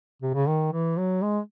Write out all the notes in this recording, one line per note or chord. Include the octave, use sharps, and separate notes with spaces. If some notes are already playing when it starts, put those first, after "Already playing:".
C3
C#3
D#3
E3
F#3
G#3